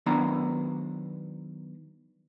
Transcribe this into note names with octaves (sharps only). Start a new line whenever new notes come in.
D#3 F#3 B3 D4 A#5